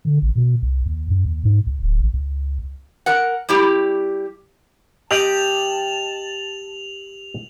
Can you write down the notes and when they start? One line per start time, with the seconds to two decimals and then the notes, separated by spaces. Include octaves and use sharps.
0.05 D3
0.22 A1
0.35 B2
0.62 C2
0.86 D#2
1.10 F#2
1.25 D#2
1.44 G#2
1.66 C#2
1.82 D1
2.00 A1
2.13 C#2
3.06 A#4 F#5
3.49 G3 E4 G4
5.11 G4 D#5 G5 A5 F7 F#7